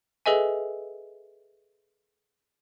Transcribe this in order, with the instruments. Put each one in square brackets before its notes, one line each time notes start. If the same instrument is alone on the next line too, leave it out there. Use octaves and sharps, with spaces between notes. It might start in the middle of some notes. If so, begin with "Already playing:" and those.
[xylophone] G#4 A4 B4 D#5 E5 G#5